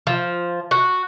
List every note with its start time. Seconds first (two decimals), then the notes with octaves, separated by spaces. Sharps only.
0.07 F3
0.71 F#4